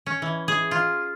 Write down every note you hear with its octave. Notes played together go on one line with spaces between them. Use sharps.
C#4
E3
G#4
F4